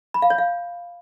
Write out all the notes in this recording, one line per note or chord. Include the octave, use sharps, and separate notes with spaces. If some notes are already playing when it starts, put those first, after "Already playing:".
B5
F5
C#5
F5